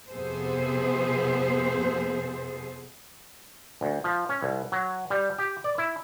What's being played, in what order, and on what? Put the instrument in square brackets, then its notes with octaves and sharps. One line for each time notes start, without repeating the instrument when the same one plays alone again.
[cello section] F2 C3 B3 G#4 A4 C5
[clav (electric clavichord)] D2
F3
C#4
C2
F#3
G3
G4
D5
E4